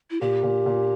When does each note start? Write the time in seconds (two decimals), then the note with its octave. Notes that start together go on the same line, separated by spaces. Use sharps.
0.11 E4
0.21 A#2 G4
0.43 A#2
0.66 A#2